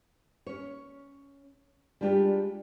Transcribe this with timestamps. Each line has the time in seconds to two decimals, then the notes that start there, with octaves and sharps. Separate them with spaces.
0.46 C#4 C#5
2.01 G3 G#3 D4 F4 G4